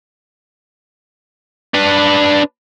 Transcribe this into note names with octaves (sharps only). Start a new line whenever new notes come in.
D4 B4